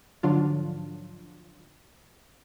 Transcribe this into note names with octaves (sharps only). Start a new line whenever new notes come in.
G#2 D3 F3 F#3 D4 F4